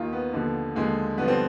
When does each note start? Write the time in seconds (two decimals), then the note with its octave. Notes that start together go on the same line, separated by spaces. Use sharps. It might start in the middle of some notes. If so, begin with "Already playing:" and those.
Already playing: D#2 D#3 F4
0.13 B3
0.33 D#2 D3 F3
0.75 D#2 D3 F3 G#3
1.18 G2 D3 F3 B3
1.28 C4